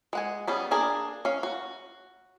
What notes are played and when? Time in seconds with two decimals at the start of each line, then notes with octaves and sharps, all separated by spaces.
0.13 G#3 F#5 G#5
0.47 G3 B3 C#4 G#4
0.71 A#3 D4 G#4 A#4
1.25 C#4 F5
1.43 F#4